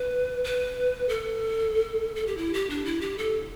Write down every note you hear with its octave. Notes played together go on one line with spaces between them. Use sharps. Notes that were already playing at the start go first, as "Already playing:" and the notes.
Already playing: B4
B4
A4
A4
G4
E4
G4
D4
E4
G4
A4